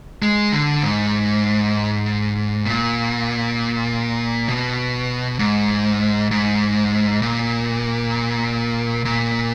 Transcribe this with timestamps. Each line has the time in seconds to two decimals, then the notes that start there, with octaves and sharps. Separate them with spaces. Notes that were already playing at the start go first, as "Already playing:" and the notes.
0.22 G#3
0.52 D3
0.82 G#2
2.66 A#2
4.48 B2
5.39 G#2
6.31 G#2
7.22 A#2
9.05 A#2